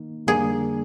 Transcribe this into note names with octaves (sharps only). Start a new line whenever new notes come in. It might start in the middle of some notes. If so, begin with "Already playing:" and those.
Already playing: D#3 A#3 D#4
F2 D3 G3 A#3 D4 G#4